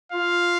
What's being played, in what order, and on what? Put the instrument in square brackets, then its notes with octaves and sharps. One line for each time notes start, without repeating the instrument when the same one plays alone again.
[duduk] F4 [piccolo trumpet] F5